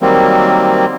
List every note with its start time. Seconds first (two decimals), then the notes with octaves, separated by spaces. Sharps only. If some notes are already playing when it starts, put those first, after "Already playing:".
0.01 D#3 F#3 G3 A#3 C4